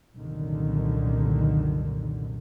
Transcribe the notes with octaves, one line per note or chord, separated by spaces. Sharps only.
C2 F#2 A#2 D3 D#3